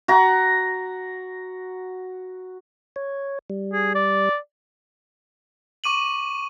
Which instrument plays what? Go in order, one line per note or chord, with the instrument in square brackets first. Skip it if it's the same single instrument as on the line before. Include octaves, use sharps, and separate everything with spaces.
[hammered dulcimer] F#4 A#5
[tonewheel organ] C#5
G3
[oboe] G#4
D5
[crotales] C#6 D6 D#7 F#7